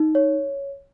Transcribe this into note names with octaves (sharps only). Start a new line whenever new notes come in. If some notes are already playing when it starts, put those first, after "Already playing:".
Already playing: D#4
C#5